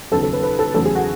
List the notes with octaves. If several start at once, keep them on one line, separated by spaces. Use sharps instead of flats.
D#2 C#3 F#3 B3 A4
A4
B4
B4
A4
E2 C#3 F#3 A3 A4
G#4
F#4